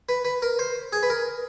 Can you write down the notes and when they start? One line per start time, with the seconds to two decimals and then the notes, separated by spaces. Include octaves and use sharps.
0.09 B4
0.25 B4
0.42 A#4
0.59 C5
0.93 G#4
1.03 B4
1.10 A#4